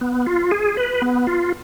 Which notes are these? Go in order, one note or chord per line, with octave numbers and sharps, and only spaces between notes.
B3
F4
G#4
B4
B3
F4